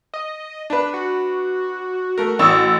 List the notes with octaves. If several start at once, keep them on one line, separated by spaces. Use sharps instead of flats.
D#5
D4 B4
F#4
A3 A#4
A1 C#6 D#6 E6